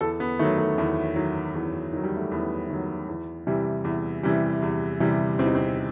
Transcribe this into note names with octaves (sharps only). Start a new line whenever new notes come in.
E2 A4
B3
D#3 F#3 A3
A3
E2 A3
D#3 F#3
E2
D#3 F#3
G3
A3
E2 B3
D#3 F#3
E2
C3 E3 G3
E2
C3 E3 G3
E2
C3 E3 G3
E2 C4
D#4
C4